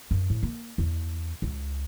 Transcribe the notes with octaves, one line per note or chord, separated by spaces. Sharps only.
F#2
A2
A#3
E2
C#2